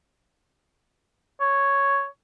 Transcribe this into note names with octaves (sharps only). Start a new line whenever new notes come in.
C#5